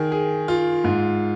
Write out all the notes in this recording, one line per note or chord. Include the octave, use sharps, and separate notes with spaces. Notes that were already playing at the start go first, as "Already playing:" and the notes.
Already playing: D#3 G#4
G#4
F4
G#2